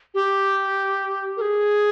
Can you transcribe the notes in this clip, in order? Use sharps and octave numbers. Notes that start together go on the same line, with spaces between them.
G4
A#4
G#4